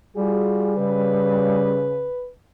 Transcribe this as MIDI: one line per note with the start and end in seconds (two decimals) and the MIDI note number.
0.16 1.87 55
0.16 0.74 65
0.16 0.74 66
0.16 0.74 68
0.78 2.08 49
0.78 2.29 71